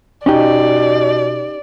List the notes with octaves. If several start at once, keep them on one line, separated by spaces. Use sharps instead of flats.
B2 C#4 D#4 G4 D5